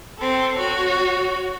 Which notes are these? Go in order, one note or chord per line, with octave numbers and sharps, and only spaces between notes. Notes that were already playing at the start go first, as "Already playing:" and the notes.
C4 A4
F#4 C#5